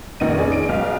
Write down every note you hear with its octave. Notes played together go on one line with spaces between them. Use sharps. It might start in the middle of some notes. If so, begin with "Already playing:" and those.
F1 A#1 D#3 D#4 D#7
C#4 G#4 D5
D7
B1 G#3 F5